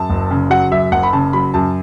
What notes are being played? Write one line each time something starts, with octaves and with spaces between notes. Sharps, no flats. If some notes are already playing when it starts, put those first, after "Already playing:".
Already playing: F#2 A5
F#1
C#3
F#3 F#5
F#2 E5
F#1 F#5
B5
C#3 A5
F#3 B5
F#2 A5